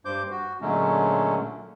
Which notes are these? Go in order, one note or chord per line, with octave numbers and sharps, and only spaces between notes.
G2 C5 D6 G6
F#4
A#2 D3 F#3 G#3 A3 C#4